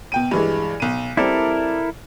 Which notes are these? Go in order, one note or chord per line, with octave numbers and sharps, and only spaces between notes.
B2 G5 D#7
G2 E3 G#3
B1 D#7
G3 C4 E4 A4 A#4 D5